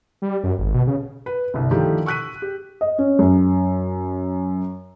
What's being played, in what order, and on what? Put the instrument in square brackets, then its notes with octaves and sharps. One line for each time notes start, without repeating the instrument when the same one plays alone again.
[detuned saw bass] G3
F#2
G#1
B2
C#3
[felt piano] B4
G1 C2
D3 D#3 F3 A3 E4 G4
C#6 E6 F#6 B6 D#7
G4
D#5
C#4
F#2